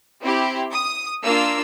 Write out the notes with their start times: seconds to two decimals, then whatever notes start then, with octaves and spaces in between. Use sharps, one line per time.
0.21 C4 E4 G4
0.72 D#6
1.22 A#3 D4 F4 E6